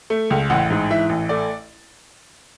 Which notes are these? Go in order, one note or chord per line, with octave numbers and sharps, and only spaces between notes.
A3
C#2
A1 F#5
G#2
E3 E5
A1
A3 D5